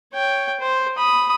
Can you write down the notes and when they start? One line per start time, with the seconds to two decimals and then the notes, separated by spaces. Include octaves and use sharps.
0.14 C#5 G5
0.60 C5
0.98 B5 D#6